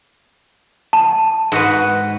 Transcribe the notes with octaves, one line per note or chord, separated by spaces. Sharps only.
A5
G#2 F#4 B4